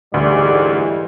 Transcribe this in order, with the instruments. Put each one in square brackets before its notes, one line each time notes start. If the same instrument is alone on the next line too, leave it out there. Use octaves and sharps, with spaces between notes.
[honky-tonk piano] D2 [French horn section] G#2 E3 G3 [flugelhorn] D5